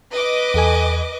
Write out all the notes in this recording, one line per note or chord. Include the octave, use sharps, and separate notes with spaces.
B4 D#5 D6
E2 A4 G#5